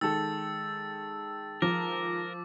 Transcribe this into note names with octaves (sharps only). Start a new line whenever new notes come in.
D#3 G#3 A4 E6 A6
F3 A#4 D6